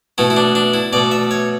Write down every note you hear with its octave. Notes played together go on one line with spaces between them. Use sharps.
B2 A3 E4
E4
D4
D4
E4
B2 A3 D5
E5
C#5